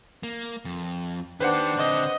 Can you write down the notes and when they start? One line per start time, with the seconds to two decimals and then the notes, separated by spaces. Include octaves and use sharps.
0.23 A#3
0.65 F2
1.40 D#3 D4 G4 B4 C5 F#5
1.77 D3 C4 D#5